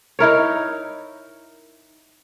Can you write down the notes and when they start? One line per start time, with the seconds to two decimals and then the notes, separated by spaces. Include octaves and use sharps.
0.19 D#4 E4 A#4 C#5